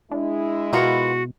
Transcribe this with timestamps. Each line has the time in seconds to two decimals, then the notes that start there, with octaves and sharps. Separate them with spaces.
0.11 G#3 D4 E4
0.73 B2 B3 F4 F#4 A#4